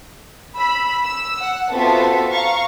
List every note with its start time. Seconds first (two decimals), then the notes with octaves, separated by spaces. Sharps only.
0.56 B5 E6
1.04 E6
1.40 F#5
1.71 B3 C4 F4 F#4 A4 E5
2.32 F5 A#5 C#6